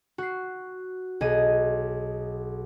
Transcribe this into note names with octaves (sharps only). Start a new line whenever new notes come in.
F#4 C7
B1 G#4 D#5 D#7